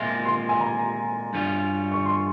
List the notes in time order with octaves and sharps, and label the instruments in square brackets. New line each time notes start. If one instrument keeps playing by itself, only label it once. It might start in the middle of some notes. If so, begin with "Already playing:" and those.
Already playing: [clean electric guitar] A#2 G#3 C4 F4 [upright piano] E5
[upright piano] C6
G#5
A#5
[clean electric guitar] G2 G3 C#4 F4
[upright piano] C#6
C6